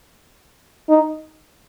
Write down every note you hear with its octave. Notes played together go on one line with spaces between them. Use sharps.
D#4